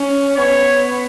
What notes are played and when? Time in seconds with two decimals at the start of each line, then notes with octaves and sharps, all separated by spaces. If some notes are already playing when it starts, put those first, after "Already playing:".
Already playing: C#4
0.37 B3 C#5